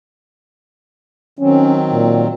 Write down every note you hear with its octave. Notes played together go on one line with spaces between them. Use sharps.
D#3 F#3 C4 C#4
A#2